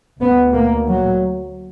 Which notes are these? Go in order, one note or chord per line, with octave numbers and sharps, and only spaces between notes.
D2 B3
A#3
F#3